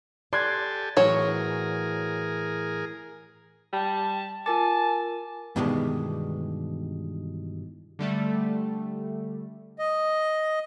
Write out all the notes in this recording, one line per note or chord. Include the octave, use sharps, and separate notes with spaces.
G4 A4 D5 G#5 C6 F#6 G#6
A2 E3 F#3 G#4 A#4 C#5
G3 A5
F4 A#4 G#5 A5 D6
G2 B2 D#3 E3 G3 G#3
D3 G3 A3
D#5